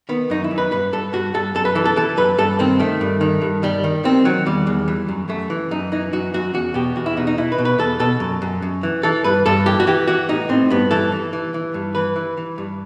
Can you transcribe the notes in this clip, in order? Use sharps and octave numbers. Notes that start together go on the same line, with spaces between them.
D#3 B3
F#2 D#4
E4
F#2
B4
G2 B4
G2 A4
G2 F#4
G2 A4
F#2 A4
B4
E3 A4
A4
E3 A4
F#2 B4
G2 A4
D#3 C4
D#3 A3
G2
D#3
G2
D#3 G3
D#3
D#3 C4
D#3 F#3
E2 G3
E2
E3
F#2
F#2 A3
E3
F#2 D#4
E3 D#4
F#2 F#4
F#2 F#4
E2 F#4
B2 G4
E2 F#4
E4
B2 D#4
D#4
B2 E4
B4
B2
B4
E2 A4
B2 A4
F#2
F#2
F#2
E3
E3 A4
G2 B4
G2 A4
E3 G4
F#4
E3 G4
E3 F#4
A2 D#4
A2 C4
G2 B3
E3 A4
E3
E3
E3
G2
E3 B4
E3
E3
G2